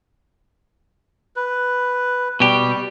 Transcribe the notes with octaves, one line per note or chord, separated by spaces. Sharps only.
B4
B2 G3 G4